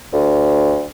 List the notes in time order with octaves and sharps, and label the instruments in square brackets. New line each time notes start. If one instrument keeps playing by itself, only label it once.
[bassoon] D2